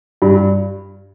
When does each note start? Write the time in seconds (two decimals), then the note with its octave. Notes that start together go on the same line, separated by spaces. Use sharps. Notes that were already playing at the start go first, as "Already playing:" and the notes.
0.22 G2